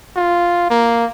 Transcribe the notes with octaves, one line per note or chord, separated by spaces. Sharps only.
F4
A#3